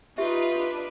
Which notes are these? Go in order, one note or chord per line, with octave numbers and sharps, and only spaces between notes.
D#4 F4 G4 B4 E5
D4